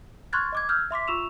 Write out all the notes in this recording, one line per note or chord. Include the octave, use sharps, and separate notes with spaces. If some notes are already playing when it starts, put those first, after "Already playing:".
C6 C#6 F6 F#6 G#6 A6
D#5 D6 G#6
E6 F6 G6 G#6
E5 C6 D6 B6
F4 C#6 E6 E7 F7